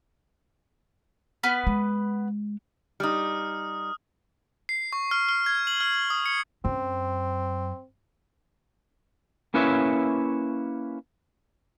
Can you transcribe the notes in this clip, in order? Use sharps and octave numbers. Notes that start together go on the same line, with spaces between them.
B3 B4 F6
G#3
G3 D#4 D#6 F6
C7
C#6
F6
F6
G#6
F#7
F6
D#6
C#7
F#2 C4
A#3 C#4 E4 B4 C#5 E5